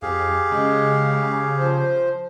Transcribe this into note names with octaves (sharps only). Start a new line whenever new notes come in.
F2 G4 G#4 F5
C#3 G#3
F3 C5